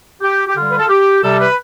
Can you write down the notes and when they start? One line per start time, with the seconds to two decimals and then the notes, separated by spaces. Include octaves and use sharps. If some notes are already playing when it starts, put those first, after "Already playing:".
0.21 G4
0.48 G4
0.55 D3 G3 F4
0.70 B4
0.79 A4
0.89 G4
1.22 C3 G3 A4
1.40 B4